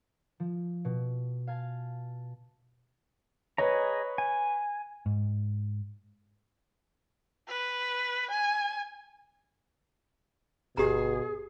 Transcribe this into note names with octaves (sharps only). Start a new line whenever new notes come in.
F3
B2
F5 G#5 A5
G#4 B4 C#5 D#5 A#5
G#5
G#2
B4
G#5
G1 B2 G4 G#4 A#5